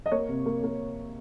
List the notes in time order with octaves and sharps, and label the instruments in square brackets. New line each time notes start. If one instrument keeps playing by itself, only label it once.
[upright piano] D#5
A#3 C#5
C3
A#3
A#3